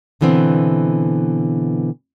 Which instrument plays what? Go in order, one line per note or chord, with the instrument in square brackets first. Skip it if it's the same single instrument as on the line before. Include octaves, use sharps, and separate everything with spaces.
[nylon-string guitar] B2 D3 E3 B3 C4